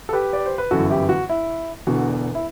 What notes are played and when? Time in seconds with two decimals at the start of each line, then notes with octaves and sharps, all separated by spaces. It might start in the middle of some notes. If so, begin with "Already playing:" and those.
0.09 A4
0.13 G4 B4
0.33 D5
0.46 C5
0.58 B4
0.71 G1 F#2 E3 F#4 A4
0.90 E4 G4
1.09 F#4
1.29 E4
1.87 E1 E2 D3 F#4
2.35 E4